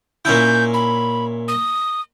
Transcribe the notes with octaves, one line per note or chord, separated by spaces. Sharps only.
A#2 C#4 E4 G6
B5
D#6